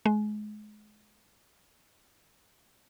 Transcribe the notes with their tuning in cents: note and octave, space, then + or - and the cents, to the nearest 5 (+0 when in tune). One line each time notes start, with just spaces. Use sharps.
G#3 +30